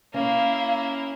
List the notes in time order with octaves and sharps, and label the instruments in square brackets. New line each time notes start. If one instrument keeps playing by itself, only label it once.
[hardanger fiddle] A#3 E4 [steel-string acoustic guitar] C#4 [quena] F5